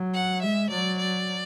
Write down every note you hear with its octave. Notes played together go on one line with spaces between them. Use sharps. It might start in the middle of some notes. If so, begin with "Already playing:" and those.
Already playing: F#3
F#5
G#3 E5
F#3 D5
D5